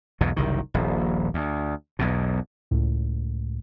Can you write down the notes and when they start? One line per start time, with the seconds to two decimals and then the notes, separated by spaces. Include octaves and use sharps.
0.21 B1 E2 G#2 B2
0.37 F#1 C2 D#3
0.74 D#1 A#1
1.34 D2
1.99 B1 E2 B2
2.71 C#2 A2